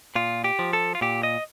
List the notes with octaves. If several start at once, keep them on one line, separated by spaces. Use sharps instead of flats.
A#2 F4
G4
F3
A4
F4
A#2 G4
D#5